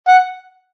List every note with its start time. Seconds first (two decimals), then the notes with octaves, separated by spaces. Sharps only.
0.08 F#5